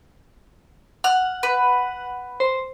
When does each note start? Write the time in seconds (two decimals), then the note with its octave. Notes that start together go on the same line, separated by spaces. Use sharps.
1.04 F#5 F6
1.43 B4
2.40 C5